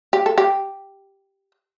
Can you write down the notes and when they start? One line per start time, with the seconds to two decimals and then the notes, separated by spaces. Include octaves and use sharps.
0.13 G4
0.26 A4
0.38 G4